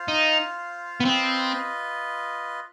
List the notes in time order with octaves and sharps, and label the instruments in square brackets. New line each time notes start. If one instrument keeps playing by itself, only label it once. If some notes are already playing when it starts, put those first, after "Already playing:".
Already playing: [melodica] F4 C5 F5
[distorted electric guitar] D#4
B3
[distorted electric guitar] C4 [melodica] F4 B4 D#5